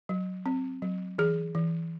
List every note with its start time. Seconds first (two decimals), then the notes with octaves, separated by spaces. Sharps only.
0.09 F#3
0.46 C4
0.82 F#3
1.18 E3 G#4
1.55 E3